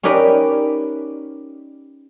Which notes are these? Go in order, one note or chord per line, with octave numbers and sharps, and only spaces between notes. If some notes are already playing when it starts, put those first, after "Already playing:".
C#4 D#4 G4 A#4 B4 D5